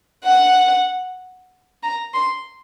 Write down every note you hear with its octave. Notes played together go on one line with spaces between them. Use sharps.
F#5
A#5
C6